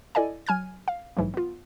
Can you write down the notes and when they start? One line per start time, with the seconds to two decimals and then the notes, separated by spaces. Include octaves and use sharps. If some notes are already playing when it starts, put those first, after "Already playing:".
0.15 E4 A4 D5 D#5 G#5
0.46 F#3 G#5 F6 G#6
0.88 F5
1.17 A#1 G#2 E3 F#3 A3
1.34 B3 F4